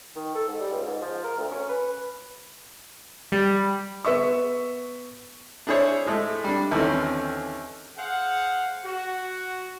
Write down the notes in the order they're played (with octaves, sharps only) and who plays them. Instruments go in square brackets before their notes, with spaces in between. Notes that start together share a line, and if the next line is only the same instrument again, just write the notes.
[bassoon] D#3
A4
G#2
G3
C#2
G#2
F3
A#4
D2
C#4
B4
[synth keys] G3
[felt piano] B3 E5 C#6
[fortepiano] D4 E4 G#4 C5 C#5
A2 G#3 A3
G3 D4
D#2 D3 E3 C4 C#4
[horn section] G#4 C5 F5 F#5
F#4